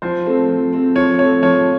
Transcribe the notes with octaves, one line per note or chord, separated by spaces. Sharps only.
F3 C5
A3 C4
F3
A3 C4
F3 C#5
A3 C4 C#5
F3 C#5